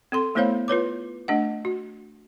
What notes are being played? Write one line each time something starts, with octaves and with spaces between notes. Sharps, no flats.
C4 A4 C6
A3 B3 E4 C5 C#5 F5
F4 B4 C#5 D6
A3 D4 D#5 F#5
F#4